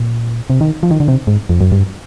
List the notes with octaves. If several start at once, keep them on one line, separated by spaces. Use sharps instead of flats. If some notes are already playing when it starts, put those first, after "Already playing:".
Already playing: A#2
C3
D#3
F3
D#3
D3
C3
G#2
F2
F#2
G2